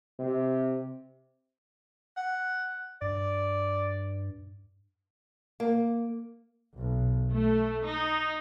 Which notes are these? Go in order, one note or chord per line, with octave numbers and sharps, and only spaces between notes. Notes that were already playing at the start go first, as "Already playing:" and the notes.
C3
F#5
G2 D5
A#3
B1
A3
D#4